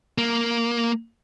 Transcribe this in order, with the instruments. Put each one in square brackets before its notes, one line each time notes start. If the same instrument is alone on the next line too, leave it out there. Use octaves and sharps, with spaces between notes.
[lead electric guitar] A#3